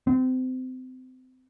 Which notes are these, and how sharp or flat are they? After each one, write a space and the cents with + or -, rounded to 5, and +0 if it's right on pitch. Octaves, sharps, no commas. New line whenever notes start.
C4 -30